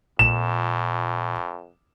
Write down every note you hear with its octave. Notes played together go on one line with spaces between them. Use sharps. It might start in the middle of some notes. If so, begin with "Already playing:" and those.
F2 A#2 E7